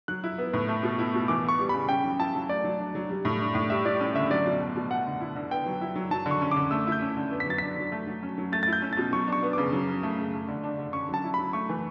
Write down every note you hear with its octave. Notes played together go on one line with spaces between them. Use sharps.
F#3 F#6
E4
B3
A2
A3
B2
E4
B2
E3 D6
B3 C#6
G3
C#3 B5
C#4 G5
F#3
E4 A5
F#3
A3 D5
F#3
D4
F#3
G3
A2
D4
A2
G3 E5
E4 D5
C#4
D3 E5
F#3 D5
B2
A3
B2
A3 F#5
D3
E4
D3
B3 G5
F#3
E4
F#3
F#3 A5
D3
C#6
C#4
D6
D3
A3 E6
E4
G6
C#4
D3
B3
B6
F#3 A6
D4 B6
F#3
A3
F#3
C#4
F#3
A3 A6
E4 A6
G6
C#4
B2 A6
F#3 C#6
D4 C#6
B3
C#3 D6
F#3
C#4
A3
C#3
A3
D3
D4
D3
C#4 C#6
F#3 A5
E4
F#3 B5
A3 C#6
E3